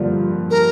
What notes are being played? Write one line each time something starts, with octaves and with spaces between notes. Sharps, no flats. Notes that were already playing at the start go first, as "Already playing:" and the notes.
Already playing: G2 D3 F3 A#3 F4
A#4